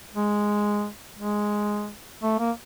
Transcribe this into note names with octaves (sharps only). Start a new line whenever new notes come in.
G#3
G#3
A3
A#3